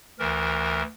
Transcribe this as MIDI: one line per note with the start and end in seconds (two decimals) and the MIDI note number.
0.19 0.82 38
0.19 0.82 52
0.19 0.82 70